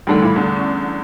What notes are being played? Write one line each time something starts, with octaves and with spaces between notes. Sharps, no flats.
D2 D3 D#3 G3 A3 A4
A#2 E3 B5
E2 D3
C#4